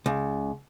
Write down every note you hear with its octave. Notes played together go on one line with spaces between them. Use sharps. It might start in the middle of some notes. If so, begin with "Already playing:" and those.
C#2